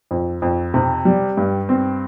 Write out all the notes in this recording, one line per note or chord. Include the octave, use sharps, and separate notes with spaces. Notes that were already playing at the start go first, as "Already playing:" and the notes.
F2
F2
C3
G3
G2
C4